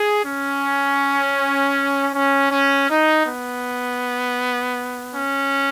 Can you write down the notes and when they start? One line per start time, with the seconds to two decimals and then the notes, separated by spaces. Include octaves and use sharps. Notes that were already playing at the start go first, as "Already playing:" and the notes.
Already playing: G#4
0.25 C#4
2.14 C#4
2.51 C#4
2.90 D#4
3.27 B3
5.15 C#4